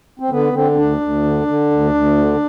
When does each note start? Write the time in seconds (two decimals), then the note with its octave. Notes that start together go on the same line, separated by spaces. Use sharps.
0.20 C4
0.30 D3 B3
0.53 D3 C4
0.72 C4
0.77 D2 D4
1.01 D2
1.24 D3
1.47 D3
1.71 D2
1.94 D2
2.17 D3